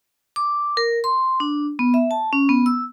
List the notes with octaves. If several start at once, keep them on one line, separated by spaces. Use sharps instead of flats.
D6
A#4
C6
D4
B3
E5
A5
C#4
B3
E6